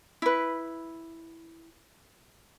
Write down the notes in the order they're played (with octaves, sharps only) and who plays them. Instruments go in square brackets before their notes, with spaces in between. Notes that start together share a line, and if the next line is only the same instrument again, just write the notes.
[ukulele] E4 B4